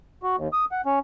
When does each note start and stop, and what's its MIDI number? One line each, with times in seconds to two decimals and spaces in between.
0.23 0.36 66
0.36 0.48 39
0.53 0.65 87
0.72 0.81 78
0.86 0.99 61